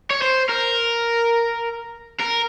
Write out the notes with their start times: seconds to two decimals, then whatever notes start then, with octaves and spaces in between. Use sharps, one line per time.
0.10 C#5
0.22 C5
0.49 A#4
2.20 A#4